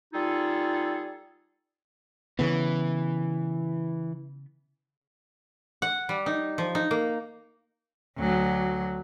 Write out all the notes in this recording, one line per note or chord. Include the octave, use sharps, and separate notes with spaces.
G3 D#4 F4 G#4 A4
C#3 E3 B3
F#5
G3
D#4
F3
D#4
A#3
D2 F#3